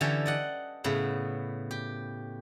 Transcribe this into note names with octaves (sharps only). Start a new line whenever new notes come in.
D3 E3 C#4 G4 A4 C#5
D5 D#5 F#5
A2 C#3 B3
G4